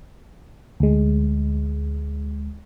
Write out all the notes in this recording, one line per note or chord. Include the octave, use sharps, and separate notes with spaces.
D2 G#3